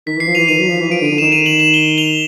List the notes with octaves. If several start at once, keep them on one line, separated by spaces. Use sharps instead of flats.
D#3 B6
E3 C7
F3
D#7 F7
E3
D#3 D#7 F7
F#3
F3
E3
F3 D7
D3
D#7
D3
D#3 E7
D#7 F7
E7 F#7
E7 F#7
G7
F7 G7